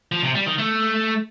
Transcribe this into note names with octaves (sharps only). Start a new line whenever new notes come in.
F3
C3
G3
D#3
A3